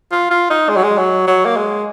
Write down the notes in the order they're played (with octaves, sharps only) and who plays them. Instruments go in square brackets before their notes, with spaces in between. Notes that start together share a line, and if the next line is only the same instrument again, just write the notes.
[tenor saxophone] F4
F4
D#4
G#3
F#3
G#3
F#3
F#3
A#3
G#3